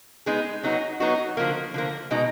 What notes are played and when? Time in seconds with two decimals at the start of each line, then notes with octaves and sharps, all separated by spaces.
0.26 G#3 B3 D#4 G#4
0.63 F#3 B3 D#4 F#4
1.00 F#3 B3 D#4 F#4
1.37 D3 F3 A#3
1.74 D3 F3 A#3
2.11 B2 G#3 D#4